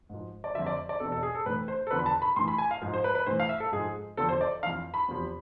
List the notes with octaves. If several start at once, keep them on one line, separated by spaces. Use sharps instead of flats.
G#2 F3
D5
F2 D3 F3 E5
D5
D5
E2 B2 A4
A4
G#4
A4
A2 E3 B4
C5
A4
E2 D3 F3 B4
B5
A5
B5
A2 E3 C6
B5
G#5
F5
G#2 F3
C5
B4
B4
A2 E3 C5
F5
E5
A4
G#2 F3 G#4
E2 D3 F3 A4
C5
D5
F2 E3 F5
B5
E2 C3 F3